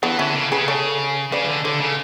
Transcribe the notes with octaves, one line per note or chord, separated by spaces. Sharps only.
E3 B3 D4
D3 C#4 E4
C#3
C#3 G#4 B4
A4 C#5
C#3 B4 D5
E3
D3
D3 A4 C#5
C#3